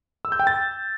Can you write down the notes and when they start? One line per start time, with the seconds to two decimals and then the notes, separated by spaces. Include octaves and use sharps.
0.25 E6
0.32 G6
0.39 G5
0.47 A6